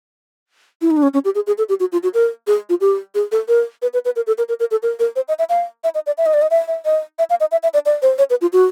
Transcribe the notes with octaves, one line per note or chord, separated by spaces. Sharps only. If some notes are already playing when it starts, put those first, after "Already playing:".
E4
D#4
D4
C#4
C#4
G4
G#4
G#4
A4
G4
F#4
F4
F#4
A#4
G#4
F4
G4
G#4
A4
A#4
B4
B4
B4
A#4
A4
A#4
A#4
A#4
A4
A#4
A#4
C5
D#5
E5
F5
E5
D#5
D5
E5
D#5
D5
D#5
E5
E5
D#5
E5
F5
D#5
E5
E5
D5
D5
C5
C#5
B4
F4
F#4